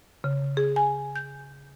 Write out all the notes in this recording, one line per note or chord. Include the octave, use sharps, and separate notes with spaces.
C#3
G#4
G#5
G6